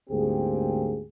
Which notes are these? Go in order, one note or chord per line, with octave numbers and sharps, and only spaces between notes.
D2 G#2 A#3 C4 G4 G#4